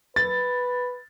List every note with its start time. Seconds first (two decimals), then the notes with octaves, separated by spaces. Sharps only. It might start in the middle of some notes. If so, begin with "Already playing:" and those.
0.16 B4 A6